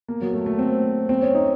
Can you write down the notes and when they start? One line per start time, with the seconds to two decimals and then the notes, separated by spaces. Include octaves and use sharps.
0.08 A#3
0.21 F#3
0.34 A3
0.46 A3
0.59 C4
1.09 C4
1.22 C#4
1.35 D#4